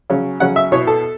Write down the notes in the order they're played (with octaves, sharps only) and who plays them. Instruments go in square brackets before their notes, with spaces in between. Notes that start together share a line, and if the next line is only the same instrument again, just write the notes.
[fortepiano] C#3 F#3 C#4
C#3 F#3 C#4 F#5
E5
B2 B3 E4 C#5
A4